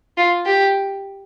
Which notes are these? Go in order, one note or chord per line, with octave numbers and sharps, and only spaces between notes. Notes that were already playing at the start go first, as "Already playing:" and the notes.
F4
G4